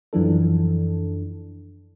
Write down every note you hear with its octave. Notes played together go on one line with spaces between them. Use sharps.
F#2 E3 F3 D4 A4